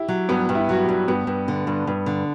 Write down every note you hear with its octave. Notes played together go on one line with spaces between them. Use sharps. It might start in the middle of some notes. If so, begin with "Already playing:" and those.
Already playing: E4 G4
F#3
G2 B3
G2
E4
F#3 F#4
G4
G2
G2 B3
G2
D3
G2
G2
D3